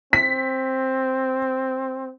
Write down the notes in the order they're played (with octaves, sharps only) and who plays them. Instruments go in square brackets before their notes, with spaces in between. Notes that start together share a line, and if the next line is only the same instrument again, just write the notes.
[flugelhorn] C4 [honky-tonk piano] B6